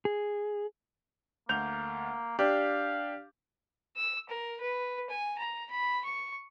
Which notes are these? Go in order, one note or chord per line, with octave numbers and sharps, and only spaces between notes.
G#4
D2 A#3 G6 F7
D4 G4 F5
E6
A#4
B4
G#5
A#5
B5
C#6